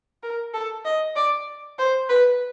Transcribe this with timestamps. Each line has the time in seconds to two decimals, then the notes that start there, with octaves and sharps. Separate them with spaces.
0.23 A#4
0.54 A4
0.85 D#5
1.16 D5
1.78 C5
2.09 B4